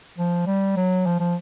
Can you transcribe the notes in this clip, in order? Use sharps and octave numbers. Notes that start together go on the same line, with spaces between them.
F3
G3
F#3
F3
F3